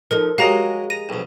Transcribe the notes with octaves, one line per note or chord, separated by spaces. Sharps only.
F3 D#4 A4 A#4
F#3 G#3 G4 A#4 D#5 F5 A#5
A#5 D#7
B1 F2